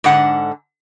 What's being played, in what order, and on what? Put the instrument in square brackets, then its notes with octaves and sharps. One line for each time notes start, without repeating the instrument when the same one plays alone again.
[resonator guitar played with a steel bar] G#2 D3 F#5